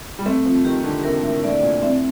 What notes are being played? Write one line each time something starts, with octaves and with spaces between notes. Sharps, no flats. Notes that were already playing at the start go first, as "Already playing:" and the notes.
G3
A3 C4
F3
D#3 G4
D3
C3 A#4
A2
A2 D5
A#2
A2 C4